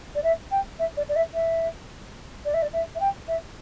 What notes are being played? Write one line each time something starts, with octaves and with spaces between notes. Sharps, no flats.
D5
E5
G5
E5
D5
D5
E5
E5
D5
E5
D5
E5
E5
G5
E5